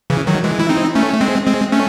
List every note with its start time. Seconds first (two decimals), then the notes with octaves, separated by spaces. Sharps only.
0.10 C#3 E3
0.27 D#3 F#3
0.44 E3 G#3
0.59 E4
0.69 C4 D#4
0.95 A3 C#4
1.14 A3
1.21 G#3 C4
1.46 G#3 C4
1.72 A3 C#4